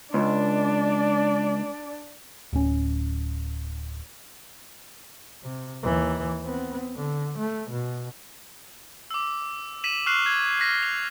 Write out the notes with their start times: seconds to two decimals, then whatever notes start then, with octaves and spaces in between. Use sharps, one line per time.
0.14 C#2 D4 D5
2.53 D1 C#4
5.43 C3
5.83 D#2 E3
6.44 B3 C4
6.97 D3
7.38 A3
7.70 B2
9.11 D6 E6
9.84 B6 D#7 E7 F#7
10.06 C#6 F6 F#6 C7 F7 F#7
10.26 G#6
10.60 F6 A#6 B6
10.83 F7